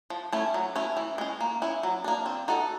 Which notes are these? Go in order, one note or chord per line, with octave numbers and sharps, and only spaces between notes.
F3
A3 C#4 E4
F#3
A3 C#4 E4
E3
G#3 C#4
A#3
C#4 E4
F#3
A#3 D4
C4
D#4 F#4 A4